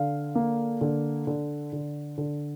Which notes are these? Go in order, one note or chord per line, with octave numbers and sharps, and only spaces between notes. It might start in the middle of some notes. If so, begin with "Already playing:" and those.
Already playing: D3 F5
A#3
D3
D3
D3
D3